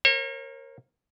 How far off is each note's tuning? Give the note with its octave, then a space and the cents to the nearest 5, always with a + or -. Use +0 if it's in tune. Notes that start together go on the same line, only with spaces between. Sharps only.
A#4 +0 C#5 -40